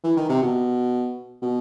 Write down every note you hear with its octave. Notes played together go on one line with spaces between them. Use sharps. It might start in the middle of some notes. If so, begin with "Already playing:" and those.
E3
D#3
C3
B2
B2